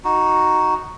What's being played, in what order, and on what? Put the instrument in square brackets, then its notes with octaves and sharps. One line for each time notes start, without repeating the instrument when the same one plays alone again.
[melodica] D#4 F#4